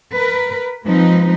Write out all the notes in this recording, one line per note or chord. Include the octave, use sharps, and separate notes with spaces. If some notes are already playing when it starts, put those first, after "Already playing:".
A#4 B4
F3 G#3 C4 D#4 B4